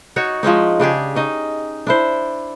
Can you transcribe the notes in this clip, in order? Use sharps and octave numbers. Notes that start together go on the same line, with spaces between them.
D#4 F#4 C#5
F3 G#3 C#4 D#4
C#3 D4 G4 G#4
C#4 D#4 D#5
D4 E4 C5